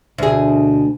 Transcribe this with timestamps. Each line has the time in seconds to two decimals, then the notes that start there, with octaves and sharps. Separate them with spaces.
0.18 D2 B2 G#4